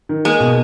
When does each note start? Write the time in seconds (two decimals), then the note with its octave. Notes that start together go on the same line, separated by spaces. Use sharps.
0.09 D#3
0.25 G#3 A#3
0.40 B2